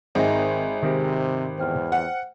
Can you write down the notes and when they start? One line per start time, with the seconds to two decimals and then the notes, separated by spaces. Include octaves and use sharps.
0.15 G#1 D#3 C4 D#4 G#4 E5 G#5
0.83 C3 D#3 C4 G4
1.58 E2 C5 G5 F6
1.92 F#5